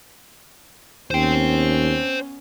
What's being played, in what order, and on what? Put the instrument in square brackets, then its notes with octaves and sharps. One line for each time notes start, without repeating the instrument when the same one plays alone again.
[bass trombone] D#2 [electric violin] B3 C#4 [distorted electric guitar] C5 G5